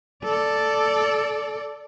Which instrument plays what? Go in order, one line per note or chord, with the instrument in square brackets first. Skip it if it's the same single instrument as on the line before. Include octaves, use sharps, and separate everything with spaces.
[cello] A4 D5